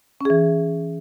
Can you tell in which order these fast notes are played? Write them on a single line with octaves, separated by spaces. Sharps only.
C#4 G#4 E3